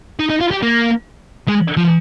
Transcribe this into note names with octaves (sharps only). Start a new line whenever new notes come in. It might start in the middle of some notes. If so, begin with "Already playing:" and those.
D#4
D#4
F4
G4
A#3
G#3
F3